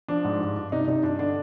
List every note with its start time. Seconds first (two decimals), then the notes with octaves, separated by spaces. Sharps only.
0.08 F3 D4
0.24 G#2
0.40 G2
0.57 G2
0.72 C3 D#4
0.87 C3 D#4
1.03 G2 D4
1.19 D3 D4